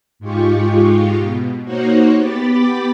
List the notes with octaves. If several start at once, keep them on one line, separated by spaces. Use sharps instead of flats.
G#2 G#3 F4 G4 C#6
B2
A#3 D#4 F#4 C5 C#5 F#5
B3 G4 B5 D6 A6 B6